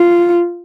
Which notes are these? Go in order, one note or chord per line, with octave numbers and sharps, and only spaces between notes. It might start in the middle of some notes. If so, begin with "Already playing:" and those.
Already playing: F4